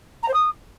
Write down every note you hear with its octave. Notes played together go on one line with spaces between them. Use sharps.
A#5
C5
D#6